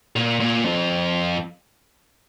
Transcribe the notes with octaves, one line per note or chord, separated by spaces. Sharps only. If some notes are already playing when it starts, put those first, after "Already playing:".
A#2
A#2
F2